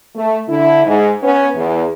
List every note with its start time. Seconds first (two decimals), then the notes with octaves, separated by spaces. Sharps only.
0.15 A3
0.47 D3 E4
0.85 G#2
1.22 B3 C#4
1.55 E2